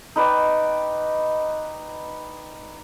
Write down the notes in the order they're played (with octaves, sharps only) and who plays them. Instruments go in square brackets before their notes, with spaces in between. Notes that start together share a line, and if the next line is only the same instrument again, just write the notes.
[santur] D#4 B4 D5 G5